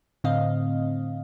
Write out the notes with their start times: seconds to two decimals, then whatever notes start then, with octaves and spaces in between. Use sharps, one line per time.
0.24 A2 D3 C4 D#5 F5